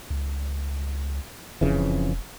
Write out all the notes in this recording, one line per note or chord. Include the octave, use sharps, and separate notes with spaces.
C#2
E1 F2 C#3 E3